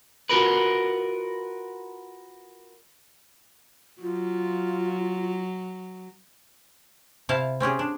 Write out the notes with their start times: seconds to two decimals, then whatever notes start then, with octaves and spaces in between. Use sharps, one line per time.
0.29 F4 F#4 A#4 B4
4.02 F#3 F4
7.29 C3 E4 F5 A5
7.60 C4 C#4 G4 G#4
7.79 D4